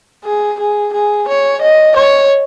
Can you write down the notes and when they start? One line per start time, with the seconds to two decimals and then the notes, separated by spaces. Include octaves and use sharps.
0.24 G#4
0.59 G#4
0.93 G#4
1.28 C#5
1.62 D#5
1.96 C#5